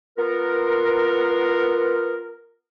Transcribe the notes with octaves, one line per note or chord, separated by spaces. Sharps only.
B3 F4 A#4